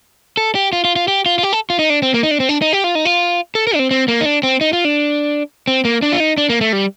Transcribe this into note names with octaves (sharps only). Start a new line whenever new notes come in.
A4
G4
F4
F4
F4
G4
F4
F4
G4
A4
F4
D#4
D4
C4
A#3
D#4
D4
C4
D4
D#4
G4
F4
D#4
F4
A4
A#4
D4
C4
C4
A#3
D#4
D4
C4
D#4
F4
D4
C4
A#3
D4
F4
D#4
D4
A#3
A3
G3